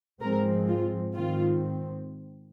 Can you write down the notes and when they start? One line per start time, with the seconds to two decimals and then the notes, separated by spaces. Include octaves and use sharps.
0.21 G#2 F3 G#3 C4 A#4
0.68 F4
1.14 G#2 D#3 C4 F4